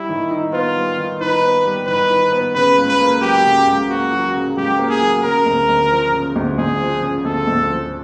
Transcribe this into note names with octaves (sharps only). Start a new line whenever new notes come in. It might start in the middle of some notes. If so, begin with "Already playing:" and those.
Already playing: G3 E4
D#3
D#4
B3 F4
G3
D#3
D#4 B4
B3
G3
D#3 B4
D#4
B3
C#3 B4
C#2
B4
A#3
F#3 G4
C#3
C#2
A#3 F#4
F#3
C#3
C#2 G4
A#3
G#4
F#3
C#3 A#4
D2
D2
F3
C#3
D2
D2 G#4
F3
C#3
D2 A4
D2
F3